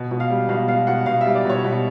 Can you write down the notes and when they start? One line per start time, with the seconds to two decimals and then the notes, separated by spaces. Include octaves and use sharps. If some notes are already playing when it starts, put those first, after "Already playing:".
Already playing: B2
0.11 B2
0.20 F5
0.30 G3
0.49 B2 F5
0.68 B2 F5
0.87 B2 F#5
1.06 B2 F5
1.21 E5
1.26 G3
1.35 D5
1.45 B2 C#5
1.64 B2